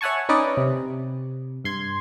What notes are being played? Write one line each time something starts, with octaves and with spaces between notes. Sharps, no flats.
C#5 E5 F#5 G#5 A5 C#6
C#4 D#4 B4 D5 D#5
C3
G2 C6 G#6